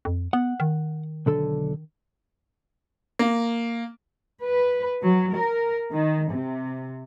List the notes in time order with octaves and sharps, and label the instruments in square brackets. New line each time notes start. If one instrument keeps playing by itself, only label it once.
[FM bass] F2
[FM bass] B3 [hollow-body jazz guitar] F#5
[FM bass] D#3
[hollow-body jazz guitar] B1 D3 A4
[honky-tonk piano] A#3
[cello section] B4
F#3
A#4
D#3
C3